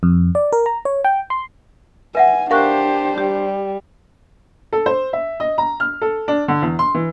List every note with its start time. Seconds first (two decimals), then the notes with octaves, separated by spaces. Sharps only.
0.03 F2
0.35 D5
0.53 A#4
0.66 A#5
0.85 C#5
1.05 G5
1.30 C6
2.15 B4 E5 F#5 G#5
2.51 D4 G4 A#4 C5 F5 C#6 F#6
3.18 G3 G4
4.73 A4
4.86 C5
5.13 E5
5.40 D#5
5.58 A#5
5.80 F6
6.02 A4
6.28 D4
6.48 D3
6.62 E2
6.79 C6
6.94 E3